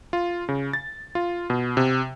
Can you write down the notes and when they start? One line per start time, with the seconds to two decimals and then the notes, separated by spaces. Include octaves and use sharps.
0.13 F4
0.49 C#3
0.73 A6
1.15 F4
1.50 B2
1.77 C3